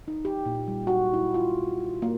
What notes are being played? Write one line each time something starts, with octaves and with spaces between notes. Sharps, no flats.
D#4
G4
A#2
G3
F#4
E4
F4
A#3